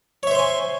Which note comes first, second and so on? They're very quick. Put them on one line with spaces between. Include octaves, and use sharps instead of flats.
C#5 E5 C5 C6 G#5